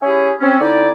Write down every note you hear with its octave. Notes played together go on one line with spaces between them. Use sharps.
C#4 E4 G4 G#4 E5 G#5
C4 C#4
D3 D#4 E4 D5